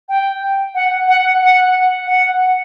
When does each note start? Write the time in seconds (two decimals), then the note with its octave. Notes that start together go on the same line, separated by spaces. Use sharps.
0.09 G5
0.75 F#5
1.08 F#5
1.41 F#5
2.07 F#5